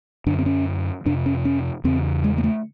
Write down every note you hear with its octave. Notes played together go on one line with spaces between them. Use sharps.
F#2 D3 D4
C4
C#4
F2 C3 D4
C#4
C#4
E2 C#3 C4
G#3
A#3
A3